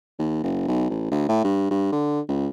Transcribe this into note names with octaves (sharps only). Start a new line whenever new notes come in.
D#2
F#1
B1
A1
D2
A2
G2
G2
D3
C#2